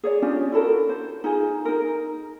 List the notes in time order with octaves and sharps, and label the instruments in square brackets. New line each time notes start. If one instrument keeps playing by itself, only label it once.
[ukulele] G#4 C#5 D5
C#4 D4 F4 G4
E4 F#4 A4 A#4
C5
D#4 F4 G#4
D#4 A#4